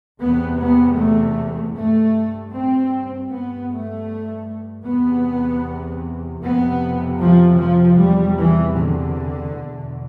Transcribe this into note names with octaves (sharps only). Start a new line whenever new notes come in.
E2 C3 B3
B3
A3
G2 A3
C4
G2 B3
A3
E2 C3 B3
F2 C3 B3
F3
F3
E2 C3 G3
E3
D3
E2 B2